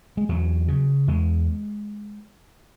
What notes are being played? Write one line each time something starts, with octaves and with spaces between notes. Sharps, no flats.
G#3
E2 F#3
C#3
E2 G#3